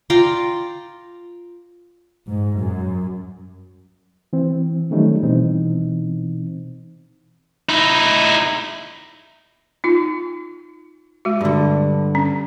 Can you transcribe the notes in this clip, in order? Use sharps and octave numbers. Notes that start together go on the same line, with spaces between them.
F4 D5 G5 A#5
G#2
F#2
E3 C4
D#3 F#3 G3 A3 C#4 D#4
B2 E3 C4 D#4
D#4 E4
D#4 F4
G#3 F#4
G2 D3
C#4